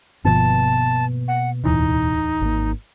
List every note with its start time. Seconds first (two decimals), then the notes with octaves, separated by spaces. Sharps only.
0.25 G1 B2 F3 A#3 B3 A5
1.28 F#5
1.64 D1 E2 E3 D#4
2.41 G#1 A#3